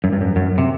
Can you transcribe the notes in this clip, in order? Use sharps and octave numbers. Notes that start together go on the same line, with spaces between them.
F#2
G2
F#2
F#2
C3